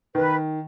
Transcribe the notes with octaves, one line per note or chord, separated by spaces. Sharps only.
D#3 B4